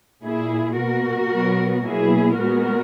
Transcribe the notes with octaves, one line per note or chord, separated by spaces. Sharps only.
A#2 A#3 E4 G#4
B2 A#3 F#4 A#4
B2 F#3 B3
B2 F#3 A#3 E4 G#4
A#2 G#3 B3 F#4 A#4